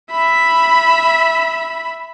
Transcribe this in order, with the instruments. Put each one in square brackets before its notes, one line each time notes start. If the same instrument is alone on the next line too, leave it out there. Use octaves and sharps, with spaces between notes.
[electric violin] E5 B5